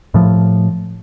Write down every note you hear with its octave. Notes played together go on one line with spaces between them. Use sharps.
A2 F3